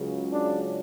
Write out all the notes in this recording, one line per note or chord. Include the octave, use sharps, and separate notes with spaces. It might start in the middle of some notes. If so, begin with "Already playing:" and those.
Already playing: C#2 C#3 F#3
D4